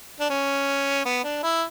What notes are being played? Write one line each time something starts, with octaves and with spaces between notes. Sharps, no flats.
D4
C#4
B3
D4
E4